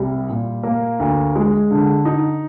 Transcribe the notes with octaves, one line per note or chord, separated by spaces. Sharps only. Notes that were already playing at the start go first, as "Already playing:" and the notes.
Already playing: C2 G3
A#2
A#3
D2
G#3
D3
D#4